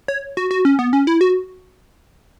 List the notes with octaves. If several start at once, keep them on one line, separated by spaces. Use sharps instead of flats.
C#5
F#4
F#4
C#4
B3
C#4
E4
F#4